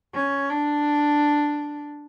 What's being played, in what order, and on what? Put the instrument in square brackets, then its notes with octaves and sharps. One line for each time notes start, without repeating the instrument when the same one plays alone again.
[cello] C#4
D4